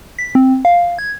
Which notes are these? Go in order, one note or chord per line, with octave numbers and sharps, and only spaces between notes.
B6
C4
F5
G#6